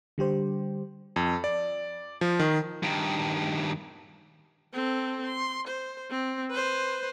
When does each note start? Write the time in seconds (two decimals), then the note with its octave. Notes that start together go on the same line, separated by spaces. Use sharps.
0.18 D3 G3 G4 C5
1.16 F2
1.44 D5
2.21 F3
2.39 D#3
2.83 G2 D#3
4.73 C4 A4
5.26 C6
5.67 C5
6.10 C4
6.50 B4 C5